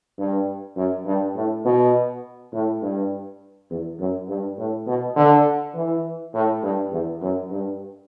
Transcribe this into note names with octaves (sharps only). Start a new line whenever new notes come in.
G2
F#2
G2
A2
B2
A2
G2
E2
F#2
G2
A2
B2
D3
E3
A2
G2
E2
F#2
G2